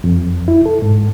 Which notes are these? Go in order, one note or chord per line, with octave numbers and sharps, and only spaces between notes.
F2
E4
A4
G#2